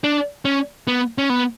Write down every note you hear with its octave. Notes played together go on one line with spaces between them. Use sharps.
D4
C#4
B3
C#4
B3